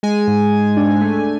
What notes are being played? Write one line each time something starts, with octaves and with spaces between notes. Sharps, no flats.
G#3 G#5
G#2
G#2
D4
A3